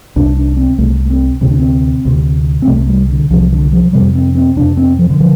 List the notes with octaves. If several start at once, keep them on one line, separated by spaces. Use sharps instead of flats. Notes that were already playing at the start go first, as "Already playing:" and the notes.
C2 C3 D4
D4
C4
C2 C3 A3
C4
D2 C3 C4
D4
C4
D2 C3
C4
C2 C3 A3
G3
D3
C2 C3 F3
D3
F3
F2 C3 G3
C4
C4
F2 C3 D4
C4
F3
D3
D3 F3